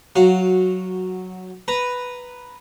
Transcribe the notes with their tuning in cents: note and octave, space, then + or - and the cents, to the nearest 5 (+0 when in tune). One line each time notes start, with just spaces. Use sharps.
F#3 +0 F#4 -10 F5 +0
B4 +0 A#5 +0